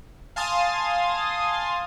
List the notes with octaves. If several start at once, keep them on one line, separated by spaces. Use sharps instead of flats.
F5 G#5 A5 C6 D#6 A6